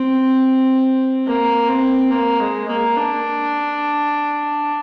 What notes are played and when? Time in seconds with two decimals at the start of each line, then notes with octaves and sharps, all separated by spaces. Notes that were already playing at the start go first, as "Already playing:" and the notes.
Already playing: C4
1.26 A#3
1.68 C4
2.11 A#3
2.40 G#3
2.68 A#3
2.96 D4